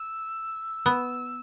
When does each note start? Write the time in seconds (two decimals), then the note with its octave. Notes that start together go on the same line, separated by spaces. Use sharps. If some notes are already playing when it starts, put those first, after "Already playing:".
Already playing: E6
0.86 B3